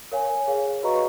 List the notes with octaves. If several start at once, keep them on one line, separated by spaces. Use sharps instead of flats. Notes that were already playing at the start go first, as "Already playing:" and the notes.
A#4 C#5 F5 G#5
G#4 C#5 F5
F#4 B4 D#5 A#5 C#6